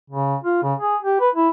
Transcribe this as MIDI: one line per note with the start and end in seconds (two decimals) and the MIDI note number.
0.10 0.36 49
0.44 0.60 65
0.63 0.74 49
0.80 0.97 68
1.02 1.21 67
1.21 1.30 71
1.35 1.49 64